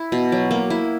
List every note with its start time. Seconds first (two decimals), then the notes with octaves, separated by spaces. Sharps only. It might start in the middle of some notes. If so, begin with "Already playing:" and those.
Already playing: E4
0.12 B2
0.32 F#3
0.51 A#3
0.70 E4